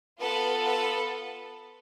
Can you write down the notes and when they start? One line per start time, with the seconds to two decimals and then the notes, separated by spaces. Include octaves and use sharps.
0.19 B3 F4 A4 B4
0.66 B4